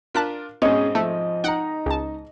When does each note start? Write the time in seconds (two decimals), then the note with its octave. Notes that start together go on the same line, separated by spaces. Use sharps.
0.15 D4 F4 A#4 A5 F#6 B6
0.62 G#2 B2 C4 C#4 G#4 C#5 D#5
0.95 F3 A3
1.44 D#4 F#5 G5 A#5
1.86 C#2 A5